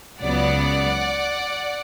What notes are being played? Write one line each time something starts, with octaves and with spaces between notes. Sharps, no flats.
C#2 C#3 F#3 B3 D5 F#5